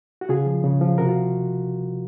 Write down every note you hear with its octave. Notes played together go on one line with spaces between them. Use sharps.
F#4
C#3 F4 G#4
F3
C#3
F3
C3 F#4 A#4
F4